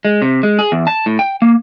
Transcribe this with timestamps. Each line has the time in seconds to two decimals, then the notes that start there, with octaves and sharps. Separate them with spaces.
0.05 G#3
0.22 C3
0.43 G#3
0.59 G#4
0.72 E2
0.87 A5
1.06 A2
1.19 G5
1.42 A#3